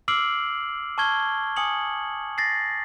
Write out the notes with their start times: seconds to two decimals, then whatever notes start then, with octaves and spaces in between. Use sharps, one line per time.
0.08 D6 E6 F6 C7 D7 F#7
0.98 A5 C#6 F6 G#6 G7
1.56 G#5 D#6 C#7 F#7
2.38 A6 A#6 C7